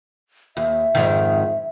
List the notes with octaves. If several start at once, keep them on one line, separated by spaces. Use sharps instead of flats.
D#2 E5
F2 G#2 D#3